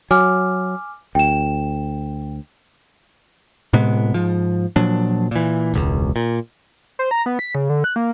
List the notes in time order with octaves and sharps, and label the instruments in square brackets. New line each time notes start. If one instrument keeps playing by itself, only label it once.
[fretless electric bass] F#3 [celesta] G#5 D6 F6
[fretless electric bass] D2 [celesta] G5 E7
[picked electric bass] A2 C3 G#3 B3
G#2 F3
A#2 F3 F#3 D4
A#2 E3
E1 C#2
A#2
[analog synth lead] C5
A#5
B3
B6
C#3
D3
F#6
A#3